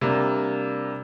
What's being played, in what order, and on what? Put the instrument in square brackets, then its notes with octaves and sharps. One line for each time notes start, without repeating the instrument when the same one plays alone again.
[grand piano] C3 G3 A#3 D4